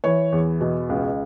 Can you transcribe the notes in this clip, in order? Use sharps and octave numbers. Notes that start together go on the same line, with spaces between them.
E3 C#5
E2
B2
C#2